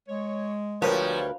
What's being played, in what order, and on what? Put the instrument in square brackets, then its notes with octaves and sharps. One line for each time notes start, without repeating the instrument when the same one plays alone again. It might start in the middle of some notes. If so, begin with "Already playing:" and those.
[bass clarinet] G#3 [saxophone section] C#5
[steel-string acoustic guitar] D2 A#4 B4 [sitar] F3 [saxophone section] G3 C#5